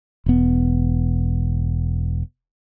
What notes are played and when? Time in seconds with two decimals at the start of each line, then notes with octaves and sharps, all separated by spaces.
0.26 E1 B3